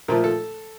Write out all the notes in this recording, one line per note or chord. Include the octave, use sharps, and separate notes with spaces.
A#2 F3 A3 A#4
A4